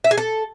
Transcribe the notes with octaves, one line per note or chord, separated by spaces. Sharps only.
E5
G#4
A4